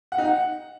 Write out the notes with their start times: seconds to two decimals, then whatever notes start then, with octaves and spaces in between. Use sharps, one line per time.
0.12 F#5
0.18 D#4
0.25 F#5